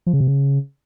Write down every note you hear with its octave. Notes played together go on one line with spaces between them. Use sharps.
F3
C#3
C3
C#3